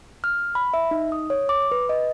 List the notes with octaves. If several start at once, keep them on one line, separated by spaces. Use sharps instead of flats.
F6
B5
E5
D#4
D#6
C#5
D6
B4
D#5